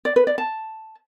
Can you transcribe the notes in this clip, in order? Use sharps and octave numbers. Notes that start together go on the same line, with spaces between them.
D5
B4
D5
A5